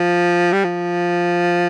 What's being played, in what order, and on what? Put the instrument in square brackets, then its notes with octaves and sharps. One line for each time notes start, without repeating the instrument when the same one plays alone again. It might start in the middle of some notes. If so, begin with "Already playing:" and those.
Already playing: [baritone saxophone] F3
G3
F3